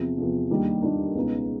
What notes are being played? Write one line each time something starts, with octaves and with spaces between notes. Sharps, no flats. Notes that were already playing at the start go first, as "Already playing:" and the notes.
Already playing: E2 C3 F3
E2 C3 F3
D#2 D#3 G3 A#3 D4
D#2 D#3 G3 A#3 D4
C#2 B2 G#3 B3 D#4